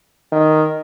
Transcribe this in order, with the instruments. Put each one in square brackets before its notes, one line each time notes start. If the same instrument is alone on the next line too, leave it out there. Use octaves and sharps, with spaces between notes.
[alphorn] D#3